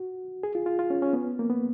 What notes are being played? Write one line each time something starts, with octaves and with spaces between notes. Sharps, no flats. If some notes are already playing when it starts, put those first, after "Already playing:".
Already playing: F#4
G#4
F4
F4
F4
C#4
C#4
B3
A#3
B3